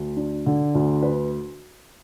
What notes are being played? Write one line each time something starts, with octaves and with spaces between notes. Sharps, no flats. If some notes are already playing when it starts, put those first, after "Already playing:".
Already playing: D2
D4
D3
D2
B4